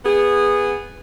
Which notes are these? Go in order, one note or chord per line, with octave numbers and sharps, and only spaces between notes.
B3 G#4